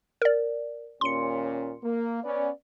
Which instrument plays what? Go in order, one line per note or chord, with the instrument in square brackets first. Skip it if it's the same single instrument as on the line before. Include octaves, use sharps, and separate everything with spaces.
[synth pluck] A#4 D5
[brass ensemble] D#2 A#2 C#4 [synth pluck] C6 C#7
[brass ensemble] A#3
B3 C#4 D5